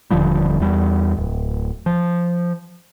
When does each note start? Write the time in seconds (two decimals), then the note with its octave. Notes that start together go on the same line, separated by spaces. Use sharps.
0.10 D#1 D3 F3 G3
0.60 E2 G3
1.17 D1
1.86 F3